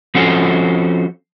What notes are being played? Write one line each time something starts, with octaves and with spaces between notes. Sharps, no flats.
F3 C4 C#4 F#4 A4 C5